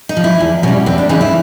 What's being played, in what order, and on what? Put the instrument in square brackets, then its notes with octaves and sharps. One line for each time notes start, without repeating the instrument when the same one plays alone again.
[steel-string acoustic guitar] D#4
F3
E4
E2
B2 G3 C#4
E2 C4
D4
C#3 E3 D#4
E4